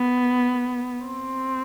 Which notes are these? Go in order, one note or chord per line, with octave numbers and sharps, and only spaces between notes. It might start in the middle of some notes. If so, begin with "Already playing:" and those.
Already playing: B3
C4